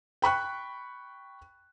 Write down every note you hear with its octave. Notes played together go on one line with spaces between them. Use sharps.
G5 B5 C#6 F#6